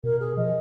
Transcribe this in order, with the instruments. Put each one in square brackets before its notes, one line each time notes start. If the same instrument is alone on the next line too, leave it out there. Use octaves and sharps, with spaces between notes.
[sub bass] B2 [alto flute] A#4
[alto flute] G#4
[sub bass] F3 [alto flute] D#5